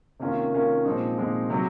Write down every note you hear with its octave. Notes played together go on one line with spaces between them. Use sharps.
C3 D#3 A#3 C#4 F4
C3 D#3 A#3 C#4 F4
A#2 F3 G#3 C4 D#4
A#2 F3 G#3 C4 D#4
C3 F#3